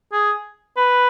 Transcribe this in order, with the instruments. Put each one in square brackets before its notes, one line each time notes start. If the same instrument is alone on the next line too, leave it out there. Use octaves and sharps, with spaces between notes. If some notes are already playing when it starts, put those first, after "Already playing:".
[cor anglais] G#4
B4